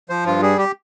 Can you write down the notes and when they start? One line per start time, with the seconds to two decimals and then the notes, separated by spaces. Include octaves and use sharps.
0.09 F3 C5
0.26 G2 F4
0.42 G3 G#4
0.58 G4